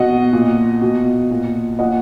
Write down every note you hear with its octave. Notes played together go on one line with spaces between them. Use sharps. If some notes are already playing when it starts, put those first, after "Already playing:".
Already playing: B2 D#5 F#5
A#2
B2
A#2
A#2 D#5 F#5